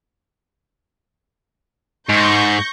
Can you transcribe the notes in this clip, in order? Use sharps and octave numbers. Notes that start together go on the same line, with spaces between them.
G#2 C#6 G6 A#6